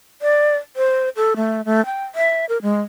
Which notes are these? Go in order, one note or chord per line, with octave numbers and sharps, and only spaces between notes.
D5
C5
A4
A3
A3
G5
E5
A#4
G#3